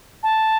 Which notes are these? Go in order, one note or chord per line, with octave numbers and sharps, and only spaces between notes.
A5